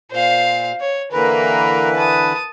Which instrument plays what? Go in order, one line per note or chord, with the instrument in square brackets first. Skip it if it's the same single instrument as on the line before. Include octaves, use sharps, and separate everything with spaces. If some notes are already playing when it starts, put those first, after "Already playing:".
[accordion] A#2 [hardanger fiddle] C5 F5
[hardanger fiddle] C#5
[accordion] D3 E3 B4 [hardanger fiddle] A#3 A#4
[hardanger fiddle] A5 D#6